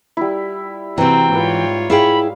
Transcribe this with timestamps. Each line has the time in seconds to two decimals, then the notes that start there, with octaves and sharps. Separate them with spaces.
0.17 G3 E4
0.98 C3 E3 C4 F#4 G5 A#5
1.33 G#2 F4 B4 C#5 D6
1.90 E4 G#4 F5 G5 B5